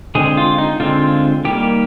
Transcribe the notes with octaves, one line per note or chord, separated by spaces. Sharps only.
D3 G#3 C4 G#4
F4
D#4
D3 G#3 C4 F4
D#3 G3 A#3 G4